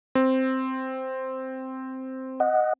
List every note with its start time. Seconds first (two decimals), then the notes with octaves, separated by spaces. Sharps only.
0.15 C4
2.40 D#5 F#5